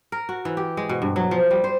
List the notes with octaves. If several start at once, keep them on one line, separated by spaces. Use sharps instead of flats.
A#4
F#4
E3
G4
G#3
B2
G2
F#3
F3
G3
C5